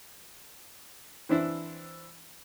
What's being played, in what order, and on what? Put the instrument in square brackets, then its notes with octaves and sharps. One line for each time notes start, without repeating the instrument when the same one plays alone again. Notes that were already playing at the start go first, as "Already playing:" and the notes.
[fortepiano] E3 C4 D4 E4